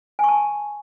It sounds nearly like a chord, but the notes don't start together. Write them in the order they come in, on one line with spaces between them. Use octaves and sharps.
G#5 C#6 A5